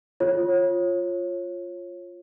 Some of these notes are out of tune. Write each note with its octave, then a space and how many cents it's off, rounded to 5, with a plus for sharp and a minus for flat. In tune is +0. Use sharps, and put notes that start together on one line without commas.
F4 +0 C#5 -25